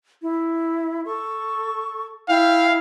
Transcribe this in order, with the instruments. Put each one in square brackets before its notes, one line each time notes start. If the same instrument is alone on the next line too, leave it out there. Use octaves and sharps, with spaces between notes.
[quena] E4
[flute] A4 [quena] C#6
[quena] E4 [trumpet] F5 [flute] G5